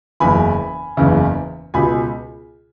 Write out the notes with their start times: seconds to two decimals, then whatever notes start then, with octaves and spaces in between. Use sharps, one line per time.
0.20 F#1 E2 C#3 G#5 B5
0.97 F#1 E2 C#3
1.74 C#2 B2 G#5 B5